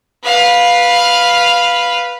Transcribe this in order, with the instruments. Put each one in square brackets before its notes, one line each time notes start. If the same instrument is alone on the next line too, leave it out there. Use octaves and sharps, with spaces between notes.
[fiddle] B4 F5